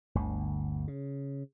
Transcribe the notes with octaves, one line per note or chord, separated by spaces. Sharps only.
G1 D2
C#3